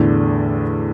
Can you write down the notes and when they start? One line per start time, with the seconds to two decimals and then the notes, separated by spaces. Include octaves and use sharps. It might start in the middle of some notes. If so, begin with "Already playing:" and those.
Already playing: E2 A2 D3 A3 D4